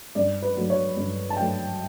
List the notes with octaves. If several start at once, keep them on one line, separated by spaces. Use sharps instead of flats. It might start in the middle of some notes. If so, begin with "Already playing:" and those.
G2 D5
B4
F#3 A3
C#5
G2
A5
F#3 A3 G5